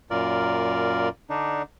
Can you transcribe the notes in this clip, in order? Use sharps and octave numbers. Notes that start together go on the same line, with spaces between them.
F#2 A#2 F4 A#4 D5
D3 D4 D#4